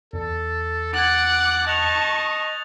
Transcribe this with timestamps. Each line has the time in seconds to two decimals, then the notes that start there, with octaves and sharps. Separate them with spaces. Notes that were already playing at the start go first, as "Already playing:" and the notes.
0.13 E2 A4
0.94 F#5 D6 F#6 G#6 A6
1.67 D#5 A5 C#6 F#6 F7 F#7